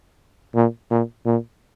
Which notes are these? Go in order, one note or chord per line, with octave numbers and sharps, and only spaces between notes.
A#2
A#2
A#2